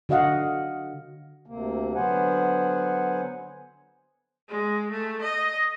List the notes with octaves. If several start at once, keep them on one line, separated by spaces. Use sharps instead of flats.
D3 F#4 D#5 F5 F#5
D2 C3 A#3
D3 F#3 B3 C5 F#5 G#5
G#3
A3
D#5